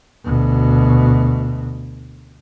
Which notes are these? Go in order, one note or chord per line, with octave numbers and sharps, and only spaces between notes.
D2 B2